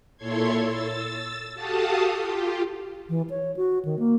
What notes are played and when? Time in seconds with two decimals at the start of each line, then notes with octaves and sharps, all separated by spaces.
0.17 A#2 E4 A4 C#5 C6 G#6
0.61 E6 A6
1.54 F#4 G4 A4 F5 A5 D#6
2.17 F4 G4
3.09 E3
3.30 C#5
3.57 F#4
3.85 D#3
3.99 A#3